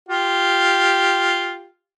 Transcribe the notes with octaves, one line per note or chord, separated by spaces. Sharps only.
F4 G4